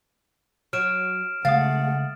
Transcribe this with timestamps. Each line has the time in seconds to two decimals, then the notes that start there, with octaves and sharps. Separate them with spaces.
0.73 F#3 F6 D7 E7
1.45 C#3 G#3 A3 F5 F#5 D#6 A6